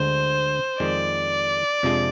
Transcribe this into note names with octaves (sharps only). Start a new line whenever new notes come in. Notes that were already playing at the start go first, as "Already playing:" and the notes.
Already playing: D2 D3 G#3 C5
F2 D#3 G#3 D5
F2 C3 F3 G#3 D4